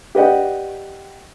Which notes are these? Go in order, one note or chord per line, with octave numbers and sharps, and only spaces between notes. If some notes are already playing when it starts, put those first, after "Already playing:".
G4 B4 D5 D#5 F#5 G5